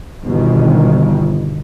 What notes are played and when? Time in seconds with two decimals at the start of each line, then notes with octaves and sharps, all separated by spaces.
0.23 G1 B2 D#3